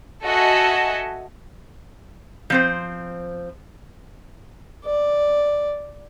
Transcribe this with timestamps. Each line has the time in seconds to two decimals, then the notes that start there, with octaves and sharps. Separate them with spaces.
0.25 F#4 A4 D#5 E5 G#5
2.50 F3 C4 C5
4.85 D5